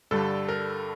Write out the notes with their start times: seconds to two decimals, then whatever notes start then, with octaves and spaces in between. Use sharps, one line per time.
0.11 G2 D3 G3 A4
0.49 A#4